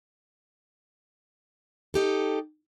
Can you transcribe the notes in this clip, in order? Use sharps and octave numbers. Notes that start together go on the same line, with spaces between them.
D#4 G4 A4